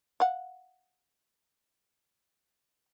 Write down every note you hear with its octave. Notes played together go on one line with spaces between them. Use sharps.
F5 F#5